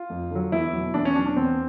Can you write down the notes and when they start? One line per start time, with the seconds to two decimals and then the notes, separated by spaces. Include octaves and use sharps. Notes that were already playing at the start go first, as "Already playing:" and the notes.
Already playing: F4
0.10 F2
0.31 D3 F#3
0.52 E2 E4
0.73 B2 F#3
0.94 E2 D4
1.05 C#4
1.15 F#3 D4
1.18 B2
1.26 D4
1.36 E2 C4